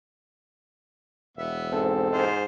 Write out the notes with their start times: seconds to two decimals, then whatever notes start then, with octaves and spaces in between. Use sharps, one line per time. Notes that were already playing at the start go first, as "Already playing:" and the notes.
1.37 E1 B3 E5
1.73 G#2 C4 A4
2.12 G#2 F4 C5